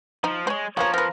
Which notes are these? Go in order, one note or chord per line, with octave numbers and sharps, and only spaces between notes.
F3 D#4
G#3 C5 C#5
F3 A#3 B3 G#4 C#5 F5 A#5
C4 A#4 B4